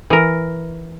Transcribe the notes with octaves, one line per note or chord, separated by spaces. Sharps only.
E3 A#4